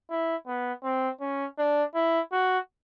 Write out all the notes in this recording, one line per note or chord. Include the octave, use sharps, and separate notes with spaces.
E4
B3
C4
C#4
D4
E4
F#4